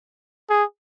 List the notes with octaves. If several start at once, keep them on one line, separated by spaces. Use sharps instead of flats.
G#4